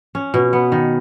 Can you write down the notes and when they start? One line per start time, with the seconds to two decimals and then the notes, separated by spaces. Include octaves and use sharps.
0.15 C#4
0.34 B2
0.53 B3
0.72 D#3